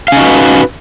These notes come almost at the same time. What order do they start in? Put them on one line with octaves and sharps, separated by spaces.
F5 C#4 D#4 F#4 B4